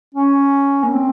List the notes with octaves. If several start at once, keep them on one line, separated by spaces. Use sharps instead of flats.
C#4
A#3
C4